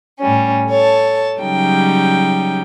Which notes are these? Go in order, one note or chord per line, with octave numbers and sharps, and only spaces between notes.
A2 G3 C#4
A4 C#5 A5
C#3 F#3 G3 D#4 G5